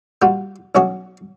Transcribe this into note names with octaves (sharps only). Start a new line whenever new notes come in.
G3 A#3 F4 F#4
B1 F#3 C#4 F#4 C#5 D#5